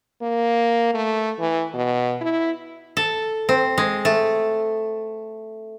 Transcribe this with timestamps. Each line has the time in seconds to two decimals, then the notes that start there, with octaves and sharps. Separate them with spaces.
0.22 A#3
0.94 A3
1.39 E3
1.74 B2
2.21 E4
2.97 A4
3.49 C4
3.78 G#3
4.05 A3